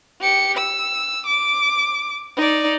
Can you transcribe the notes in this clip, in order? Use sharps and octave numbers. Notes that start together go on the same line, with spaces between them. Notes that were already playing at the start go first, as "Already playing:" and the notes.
G4 C#7
E6
D6
D#4 D5